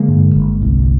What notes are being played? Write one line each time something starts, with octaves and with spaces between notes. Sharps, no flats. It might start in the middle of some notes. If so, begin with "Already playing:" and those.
Already playing: D3 G#3 A#3
G2
G1
C2